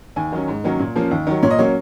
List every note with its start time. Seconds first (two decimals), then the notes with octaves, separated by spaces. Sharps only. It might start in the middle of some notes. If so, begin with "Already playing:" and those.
0.16 D#2 G#5
0.32 D#3 F#3 C#4
0.48 G#2
0.64 D#3 F#3 A#3 C#4
0.79 A#2
0.96 F3 A#3 C#4
1.11 D#2
1.27 D#3 F#3
1.43 A#2 C#5
1.50 D#5
1.59 F#3 A#3 C#4 C#5